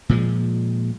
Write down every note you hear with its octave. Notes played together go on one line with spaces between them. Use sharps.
A#2 F3 G#3